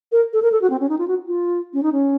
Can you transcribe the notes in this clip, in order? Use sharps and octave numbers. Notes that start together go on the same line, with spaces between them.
A#4
A4
A#4
A4
F#4
C4
C#4
D#4
F4
F#4
F4
C#4
D#4
C#4